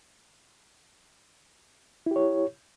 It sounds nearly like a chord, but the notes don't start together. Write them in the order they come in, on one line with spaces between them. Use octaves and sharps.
E4 G4 C#5